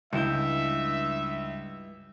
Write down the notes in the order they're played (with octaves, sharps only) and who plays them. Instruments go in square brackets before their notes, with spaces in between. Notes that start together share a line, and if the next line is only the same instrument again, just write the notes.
[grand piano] C#2 G6 [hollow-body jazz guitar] G2 E4 [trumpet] E5